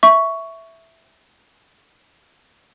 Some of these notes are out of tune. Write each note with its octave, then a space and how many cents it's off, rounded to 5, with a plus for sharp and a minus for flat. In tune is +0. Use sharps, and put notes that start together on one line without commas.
E5 +0 C#6 +10